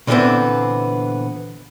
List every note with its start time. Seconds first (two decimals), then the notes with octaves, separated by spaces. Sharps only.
0.07 A#2 D3 E3 A3 B3 C4